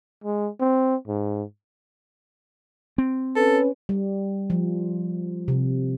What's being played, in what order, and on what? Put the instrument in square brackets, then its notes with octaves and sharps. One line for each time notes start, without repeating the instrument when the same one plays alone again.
[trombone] G#3
C4
G#2
[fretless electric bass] C4
[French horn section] C#4 B4 [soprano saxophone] A4
[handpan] G3
F3
C3